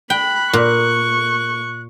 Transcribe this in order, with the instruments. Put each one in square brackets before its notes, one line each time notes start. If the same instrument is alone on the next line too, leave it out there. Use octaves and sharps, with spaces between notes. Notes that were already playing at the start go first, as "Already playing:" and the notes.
[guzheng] G5 [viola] B5 [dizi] F#6
[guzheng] A#2 [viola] C#6